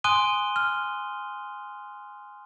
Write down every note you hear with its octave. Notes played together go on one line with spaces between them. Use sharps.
G#5 C6 D#6 F#6 D#7 G7
F6